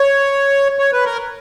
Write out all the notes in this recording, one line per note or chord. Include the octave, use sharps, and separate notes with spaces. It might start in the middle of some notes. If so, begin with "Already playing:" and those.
Already playing: C#5
C#5
B4
A#4